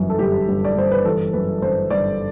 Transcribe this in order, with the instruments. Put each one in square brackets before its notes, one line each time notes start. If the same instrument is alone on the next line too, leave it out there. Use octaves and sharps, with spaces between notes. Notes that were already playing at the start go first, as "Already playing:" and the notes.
Already playing: [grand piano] G1 F#2 E3
[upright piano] A4
[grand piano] G1 [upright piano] G4
[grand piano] G1
[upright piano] D5
[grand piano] G1 [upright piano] C5
[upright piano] B4
[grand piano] E3 [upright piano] A4
[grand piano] F#2 [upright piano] B4
[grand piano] G1 [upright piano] C5
[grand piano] G1 [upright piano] D5